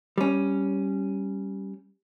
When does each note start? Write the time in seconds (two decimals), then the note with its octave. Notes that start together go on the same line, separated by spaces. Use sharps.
0.18 G3 C#4